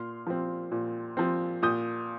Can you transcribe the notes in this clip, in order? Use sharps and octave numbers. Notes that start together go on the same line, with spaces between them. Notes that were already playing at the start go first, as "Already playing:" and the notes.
Already playing: A#2 C6 F6
F3 C4
A#2
F3 C4
A#2 D#6 G6